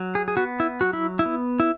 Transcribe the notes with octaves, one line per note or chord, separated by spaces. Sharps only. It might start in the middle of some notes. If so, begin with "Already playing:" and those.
Already playing: F#3
G#4
G#4
B3 F#4
E4
F#3 F#4
E4
E4
B3
E4